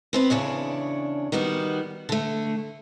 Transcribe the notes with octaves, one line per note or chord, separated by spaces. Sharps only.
B3 C4 B4
E2 C#3 D4 C#5
D#3 G3 B3 F#4
D3 A3